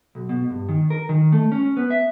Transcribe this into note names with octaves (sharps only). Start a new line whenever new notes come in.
B1
B2
G2
D#3
A#4
D#3
A3
C#4
B3
E5